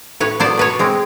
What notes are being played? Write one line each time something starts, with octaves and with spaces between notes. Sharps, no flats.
A2 B4 C#5
F#3 B3 C5 D5
B2 B4 C#5
G#3 C4